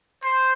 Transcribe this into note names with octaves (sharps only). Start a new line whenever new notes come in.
C5